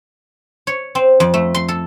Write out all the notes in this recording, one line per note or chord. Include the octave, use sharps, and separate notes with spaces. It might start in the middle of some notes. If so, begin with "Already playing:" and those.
C#5
C4
F2
A3
C6
A4